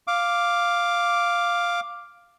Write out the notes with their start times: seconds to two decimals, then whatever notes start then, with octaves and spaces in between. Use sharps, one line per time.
0.07 F5 D6